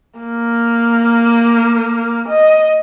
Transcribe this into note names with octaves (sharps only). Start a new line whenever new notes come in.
A#3
D#5